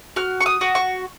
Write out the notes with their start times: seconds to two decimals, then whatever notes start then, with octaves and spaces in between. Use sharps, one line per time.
0.16 F#4 F6
0.40 C#6
0.46 D#6
0.61 F#4
0.75 C#6